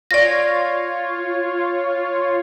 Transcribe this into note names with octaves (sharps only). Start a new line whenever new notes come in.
F4 C#5 D5 A#6